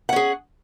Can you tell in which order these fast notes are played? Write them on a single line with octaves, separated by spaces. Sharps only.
F#5 C#4 G#4